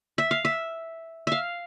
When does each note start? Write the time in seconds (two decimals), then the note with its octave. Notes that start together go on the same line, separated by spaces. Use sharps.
0.18 E5
0.31 F5
0.45 E5
1.27 E5 F5